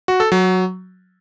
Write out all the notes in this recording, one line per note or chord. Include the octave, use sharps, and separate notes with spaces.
F#4
A4
F#3